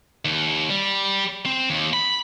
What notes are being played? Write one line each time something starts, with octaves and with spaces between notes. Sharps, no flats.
D#2
G3
C4
D#2
B5